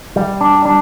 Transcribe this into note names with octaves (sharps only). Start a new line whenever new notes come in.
G3
D4
D4